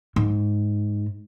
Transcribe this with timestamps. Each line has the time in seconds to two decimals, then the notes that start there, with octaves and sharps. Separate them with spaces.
0.16 G#2